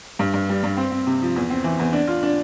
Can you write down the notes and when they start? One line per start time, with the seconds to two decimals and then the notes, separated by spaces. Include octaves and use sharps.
0.19 G2
0.34 G2
0.49 G3
0.63 G2
0.77 C4
0.92 C4
1.07 C3
1.22 F3
1.36 E2
1.50 C4
1.64 E3
1.79 E2
1.93 D4
2.07 F4
2.23 D4